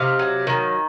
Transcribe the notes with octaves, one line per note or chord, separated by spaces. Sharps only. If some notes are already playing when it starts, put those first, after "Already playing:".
Already playing: C3 D#4 F5
F#3
D#3